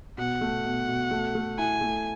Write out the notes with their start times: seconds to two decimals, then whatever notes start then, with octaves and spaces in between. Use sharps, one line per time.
0.18 B2 F#5
0.41 A3
0.64 B2
0.88 B2
1.11 A3
1.35 A3
1.58 E4 G#5
1.81 A3